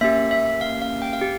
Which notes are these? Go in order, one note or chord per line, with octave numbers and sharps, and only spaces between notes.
A#3 C#4 G4 E5
E5
F5
F5
G5
F5
G4